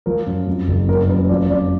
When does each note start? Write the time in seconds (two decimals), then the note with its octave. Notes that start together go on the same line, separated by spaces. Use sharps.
0.06 F3 A#4
0.27 F#2
0.47 F2
0.68 F#1
0.88 F#2 A#4
1.09 F#2 B4
1.29 F3 D5
1.50 F2 D5